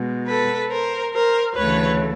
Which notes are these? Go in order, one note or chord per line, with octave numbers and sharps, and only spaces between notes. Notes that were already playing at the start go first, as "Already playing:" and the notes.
Already playing: B2 G#3
A4 B4
A#4 C5
A#4 C5
D2 C#3 E3 A3 B4 C#5